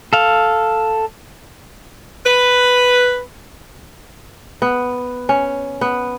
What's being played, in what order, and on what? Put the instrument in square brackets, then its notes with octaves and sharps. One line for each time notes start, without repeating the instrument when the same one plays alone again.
[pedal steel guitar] A4 F5
[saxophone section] B4
[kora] B3
C#4
B3